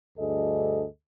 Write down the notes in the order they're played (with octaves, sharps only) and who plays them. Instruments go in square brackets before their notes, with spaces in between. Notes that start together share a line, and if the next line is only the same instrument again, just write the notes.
[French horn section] D2 G2 G#4 A4 D#5